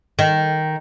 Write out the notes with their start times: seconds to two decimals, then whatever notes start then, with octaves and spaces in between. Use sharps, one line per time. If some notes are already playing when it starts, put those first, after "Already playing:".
0.19 D#3